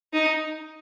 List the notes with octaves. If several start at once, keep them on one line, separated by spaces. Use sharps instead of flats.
D#4